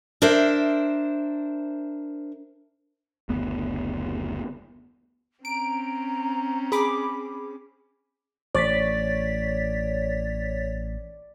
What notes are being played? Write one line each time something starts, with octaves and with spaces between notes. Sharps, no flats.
D4 A#4 C5 E5
F#1 D2 B3
C4 C#4 A#5 D7
G#4 B5 D6
A1 C#5 D5 A6 B6